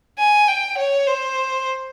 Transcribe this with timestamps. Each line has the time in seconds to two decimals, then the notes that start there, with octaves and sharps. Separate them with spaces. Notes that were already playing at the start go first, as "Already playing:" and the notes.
0.19 G#5
0.48 G5
0.78 C#5
1.07 C5